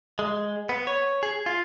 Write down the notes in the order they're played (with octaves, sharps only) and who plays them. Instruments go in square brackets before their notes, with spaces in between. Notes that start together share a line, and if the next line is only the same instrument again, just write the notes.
[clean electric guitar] G#3
B3
C#5
G#4
F4